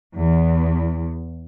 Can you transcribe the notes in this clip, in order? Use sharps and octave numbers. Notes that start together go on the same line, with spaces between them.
E2